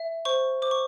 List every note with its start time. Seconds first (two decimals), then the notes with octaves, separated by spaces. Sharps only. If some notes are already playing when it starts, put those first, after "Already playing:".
Already playing: E5
0.25 C5 C#6
0.62 C5 D6
0.71 C#6